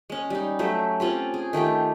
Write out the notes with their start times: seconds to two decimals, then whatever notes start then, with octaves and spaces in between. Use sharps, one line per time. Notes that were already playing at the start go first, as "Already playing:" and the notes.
0.10 G#3 C#4
0.30 G3 D#4
0.59 F#3 A3 G4 E5
1.00 C4 C#4 F4 G4
1.34 G#4
1.53 D#3 A3 F4 G4